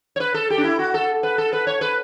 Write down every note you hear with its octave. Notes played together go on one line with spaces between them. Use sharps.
C#5
B4
A4
G4
D4
E4
F#4
A4
B4
A4
B4
C#5
B4